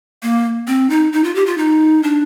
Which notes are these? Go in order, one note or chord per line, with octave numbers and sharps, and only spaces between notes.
A#3
C4
D#4
D#4
F4
G4
F4
D#4
D4